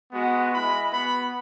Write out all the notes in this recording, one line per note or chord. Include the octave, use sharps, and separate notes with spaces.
G#3 B3 F#4
G#3 E4 B5
B3 F#4 B5